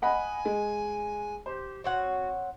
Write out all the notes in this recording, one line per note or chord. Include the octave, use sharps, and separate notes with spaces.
D#5 F#5 G#5 B5
G#3
G4 C5
C4 F#4 C#5 F#5